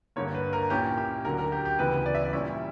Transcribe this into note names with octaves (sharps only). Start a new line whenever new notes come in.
G2 D3 A#3 C#5
B4
A#4
A#2 A#3 C#4 E4 G4
G4
D2 D3 F#3 A#4
A#4
G4
G4
D2 C#3 E3 B3 E4 B4
D5
E5
D5
A#2 G3 C#4 E4 E5